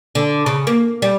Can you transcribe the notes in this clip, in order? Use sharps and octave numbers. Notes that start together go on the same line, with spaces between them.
D3
C#3
A#3
G3